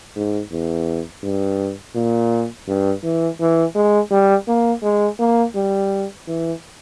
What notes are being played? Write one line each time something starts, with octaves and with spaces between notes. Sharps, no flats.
G#2
E2
G2
A#2
G2
E3
E3
G#3
G3
A#3
G#3
A#3
G3
E3